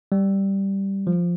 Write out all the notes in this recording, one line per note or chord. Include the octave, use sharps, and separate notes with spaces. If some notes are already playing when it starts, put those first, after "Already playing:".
G3
F3